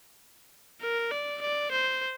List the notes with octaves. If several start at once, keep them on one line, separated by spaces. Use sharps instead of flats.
A#4
D5
D5
C5